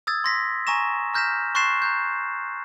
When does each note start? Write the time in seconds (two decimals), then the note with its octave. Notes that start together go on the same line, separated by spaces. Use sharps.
0.07 D#6 E6 G#6 A6
0.24 C6 A#6 B6
0.67 G#5 A#5 C#6 A#6 E7
1.14 A#5 F6 G6 A#6 B6 E7
1.55 C6 C#6 F#6 A6 C7 E7
1.82 A#5 F#6 G6